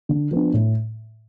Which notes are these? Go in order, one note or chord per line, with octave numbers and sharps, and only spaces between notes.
D3
F3 B3 D4
A2